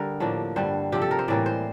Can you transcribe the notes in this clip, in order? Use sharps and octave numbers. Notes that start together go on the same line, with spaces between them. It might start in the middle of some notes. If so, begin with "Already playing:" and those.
Already playing: D3 G3 A#4
A2 F3 A#3 D4
G2 D3 G3 C5
C3 F3 C4 G4
A4
A#4
C5
A2 E3 G3 A#3 D5
C5